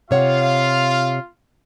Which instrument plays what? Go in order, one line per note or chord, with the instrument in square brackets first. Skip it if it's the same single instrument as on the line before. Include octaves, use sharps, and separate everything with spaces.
[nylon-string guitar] C3 C#5 F#5 [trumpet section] F4 F5